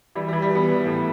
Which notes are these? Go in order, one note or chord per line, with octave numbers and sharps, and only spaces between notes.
E3 G3
G3
E3
G3
E3 B3
E3
A2